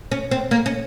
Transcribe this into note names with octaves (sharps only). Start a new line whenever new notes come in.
C#4
C4
A#3
C#4